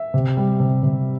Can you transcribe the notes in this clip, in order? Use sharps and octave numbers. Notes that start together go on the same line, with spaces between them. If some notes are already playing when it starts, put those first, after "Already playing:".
Already playing: E5
C3
G3
C3
C3